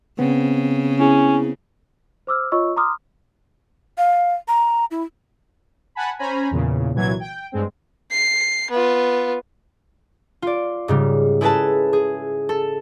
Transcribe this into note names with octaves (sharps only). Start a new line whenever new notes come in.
C#3 B3 C4
C#4 E4 G#4
C5 D6 E6 F6
F4 C#5 D#5 C#6 E6
A#5 C6 D6 D#6 F6
F5
A#5
E4
F#5 G#5 A5 B5
C#4 C5 G#5 A#5 B5
E2 A#2 C#3
C2 A#2 E3 F#3 G#6
G5
G2 G#3 C4
C7
B3 F4
F4 D5
G#2 C#3 G3
E4 G#4 A4 B4 E5 A5
G#4
A4